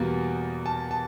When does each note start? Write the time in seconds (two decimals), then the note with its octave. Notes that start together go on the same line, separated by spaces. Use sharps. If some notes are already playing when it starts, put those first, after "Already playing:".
Already playing: E2 B2 G3 A#3
0.66 A5
0.91 A5